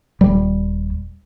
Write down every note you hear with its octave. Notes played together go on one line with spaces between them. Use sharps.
D#1 G3